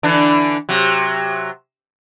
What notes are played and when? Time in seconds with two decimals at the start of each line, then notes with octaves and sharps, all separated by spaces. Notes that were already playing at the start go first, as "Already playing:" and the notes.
0.03 D3 E3 D4
0.69 C3 F#3